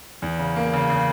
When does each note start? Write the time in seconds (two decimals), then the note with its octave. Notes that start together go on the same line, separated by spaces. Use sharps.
0.22 E2
0.38 C#3
0.56 A#3
0.73 C#3
0.90 C#3